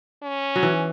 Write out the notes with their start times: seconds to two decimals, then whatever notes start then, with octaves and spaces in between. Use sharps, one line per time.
0.22 C#4
0.56 F#3
0.63 E3